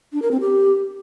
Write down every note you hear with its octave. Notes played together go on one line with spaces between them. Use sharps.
D4
A#4
C4
G4